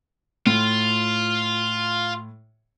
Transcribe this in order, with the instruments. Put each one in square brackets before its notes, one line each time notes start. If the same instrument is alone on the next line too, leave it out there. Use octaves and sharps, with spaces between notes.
[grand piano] A2 [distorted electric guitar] F4